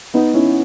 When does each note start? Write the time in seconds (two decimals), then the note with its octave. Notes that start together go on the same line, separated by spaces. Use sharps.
0.14 B3 D#4
0.34 C#4 E4